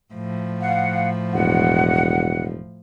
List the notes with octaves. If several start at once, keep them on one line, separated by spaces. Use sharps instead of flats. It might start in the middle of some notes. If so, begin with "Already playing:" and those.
A2 F3
F5 F#5
E1 F#5